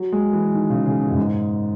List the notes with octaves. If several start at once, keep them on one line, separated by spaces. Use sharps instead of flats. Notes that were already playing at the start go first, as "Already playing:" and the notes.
Already playing: F#3
G#3
E3
D#3
C#3
C#3
B2
F#2
G#2